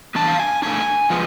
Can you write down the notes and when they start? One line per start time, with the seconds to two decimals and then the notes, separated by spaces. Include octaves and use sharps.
0.15 E3 B3 D4 A5
0.28 F5
0.39 G#5
0.62 B2 A3 D4 G#5
1.10 F3 G#3 B3